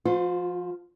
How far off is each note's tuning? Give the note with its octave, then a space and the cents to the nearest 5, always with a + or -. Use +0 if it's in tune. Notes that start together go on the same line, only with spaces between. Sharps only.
F3 +0 F4 +40 C5 -20